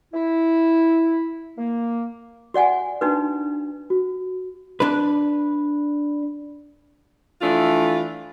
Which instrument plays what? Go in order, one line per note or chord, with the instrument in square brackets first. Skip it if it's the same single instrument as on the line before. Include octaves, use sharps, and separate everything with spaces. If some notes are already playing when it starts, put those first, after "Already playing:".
[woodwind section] E4
A#3
[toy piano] F#4 D5 F#5 G#5
D4 D#4 F#4 B4
[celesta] F#4
[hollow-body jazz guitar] D4 B4
[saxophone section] E3 F3 A3 D4 F4